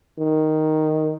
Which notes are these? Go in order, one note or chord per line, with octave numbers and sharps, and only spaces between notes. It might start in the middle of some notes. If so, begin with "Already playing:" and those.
D#3